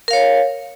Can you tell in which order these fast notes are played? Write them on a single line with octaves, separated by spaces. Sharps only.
A#4 F5 C#5